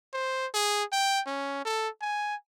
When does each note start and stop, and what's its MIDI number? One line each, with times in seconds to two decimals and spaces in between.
0.13 0.47 72
0.54 0.84 68
0.92 1.21 79
1.26 1.65 61
1.65 1.89 69
2.01 2.36 80